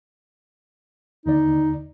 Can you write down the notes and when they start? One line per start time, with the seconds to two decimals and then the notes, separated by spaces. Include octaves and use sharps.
1.26 D#2 D3 D#4 D5